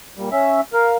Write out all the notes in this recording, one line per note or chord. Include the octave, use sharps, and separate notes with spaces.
A#2 G3
C#4 E5
A#4 F5